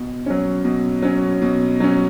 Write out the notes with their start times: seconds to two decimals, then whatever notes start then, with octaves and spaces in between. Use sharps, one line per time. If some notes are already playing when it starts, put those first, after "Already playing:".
Already playing: B2
0.26 F#3 C#4
0.65 B2
1.02 F#3 C#4
1.42 B2
1.80 F#3 C#4